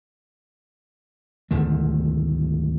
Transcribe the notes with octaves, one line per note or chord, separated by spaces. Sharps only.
G#1 D2 F3 A3